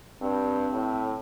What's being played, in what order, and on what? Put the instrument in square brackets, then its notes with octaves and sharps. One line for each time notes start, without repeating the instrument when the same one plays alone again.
[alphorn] G2 [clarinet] C4
[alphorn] A2